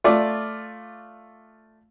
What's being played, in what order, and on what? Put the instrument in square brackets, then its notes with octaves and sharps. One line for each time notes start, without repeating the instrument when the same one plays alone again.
[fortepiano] A3 F4 D5